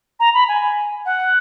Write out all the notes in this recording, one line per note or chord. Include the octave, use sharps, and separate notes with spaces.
A#5
B5
G#5
F#5